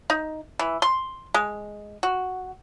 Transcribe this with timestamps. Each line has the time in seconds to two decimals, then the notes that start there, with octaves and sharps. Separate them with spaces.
0.10 D#4
0.59 E3
0.82 C6
1.34 G#3
2.03 F#4